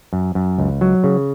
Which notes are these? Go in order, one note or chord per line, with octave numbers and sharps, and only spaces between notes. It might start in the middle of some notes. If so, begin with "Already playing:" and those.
F#2
F#2
C#2
F#3
C#3